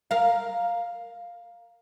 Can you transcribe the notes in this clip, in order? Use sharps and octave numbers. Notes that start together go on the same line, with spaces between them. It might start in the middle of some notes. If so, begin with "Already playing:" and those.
A#4 F5